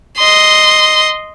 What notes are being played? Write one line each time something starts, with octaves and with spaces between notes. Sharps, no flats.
D#5 C6